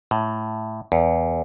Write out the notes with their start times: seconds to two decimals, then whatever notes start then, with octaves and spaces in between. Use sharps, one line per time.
0.11 A2
0.92 E2